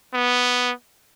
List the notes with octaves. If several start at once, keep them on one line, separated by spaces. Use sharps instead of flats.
B3